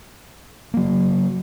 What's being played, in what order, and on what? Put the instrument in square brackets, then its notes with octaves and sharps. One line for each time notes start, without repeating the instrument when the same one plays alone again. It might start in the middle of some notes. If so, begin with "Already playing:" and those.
[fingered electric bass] F#3 A#3